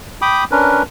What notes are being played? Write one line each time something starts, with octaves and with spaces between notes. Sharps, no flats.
G5 B5 D6 D#6
C#4 D4 A#4 B4